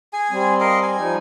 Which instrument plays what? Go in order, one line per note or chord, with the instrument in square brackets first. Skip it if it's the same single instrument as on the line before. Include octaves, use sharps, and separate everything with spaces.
[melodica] G#4 G#5
[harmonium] G3 C4
[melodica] A#4 D#5 F5
G#5
[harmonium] F3 G3 D#4